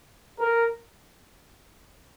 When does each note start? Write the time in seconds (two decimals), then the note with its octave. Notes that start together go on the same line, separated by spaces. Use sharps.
0.40 A#4